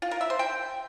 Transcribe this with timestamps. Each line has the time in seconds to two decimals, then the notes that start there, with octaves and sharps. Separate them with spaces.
0.02 F4
0.11 A#4
0.21 E5
0.30 C5
0.39 G5